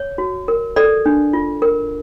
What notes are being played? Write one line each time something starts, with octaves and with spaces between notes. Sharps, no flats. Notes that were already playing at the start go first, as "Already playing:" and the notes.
Already playing: C#5
F#4
A#4
A4 D5
D4
F4
A#4